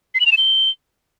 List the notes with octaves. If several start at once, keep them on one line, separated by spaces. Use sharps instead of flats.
C7
F#7
F7
E7
G7